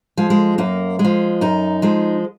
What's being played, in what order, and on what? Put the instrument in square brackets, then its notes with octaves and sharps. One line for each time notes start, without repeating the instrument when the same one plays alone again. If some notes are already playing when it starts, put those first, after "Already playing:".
[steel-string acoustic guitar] F3 G#3
G#3
F#2 A#3
G#3
F3
F#2 D#4
F3 G#3